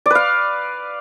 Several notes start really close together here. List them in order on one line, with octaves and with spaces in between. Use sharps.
D5 B4 F5